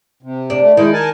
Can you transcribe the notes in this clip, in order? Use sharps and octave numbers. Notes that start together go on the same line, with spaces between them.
C3
D4
A3
D#3 G#3 E4
A#4 G#5 A5